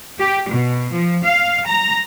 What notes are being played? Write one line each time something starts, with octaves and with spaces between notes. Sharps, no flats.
G4
B2
F3
F5
A#5